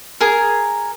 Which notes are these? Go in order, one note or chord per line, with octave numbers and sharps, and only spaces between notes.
G#4 A#4